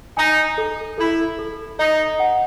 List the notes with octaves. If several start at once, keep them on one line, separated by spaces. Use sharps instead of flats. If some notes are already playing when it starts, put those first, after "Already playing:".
D#4 G#5
A4
E4 A4
A4
D#4 D#5
F#5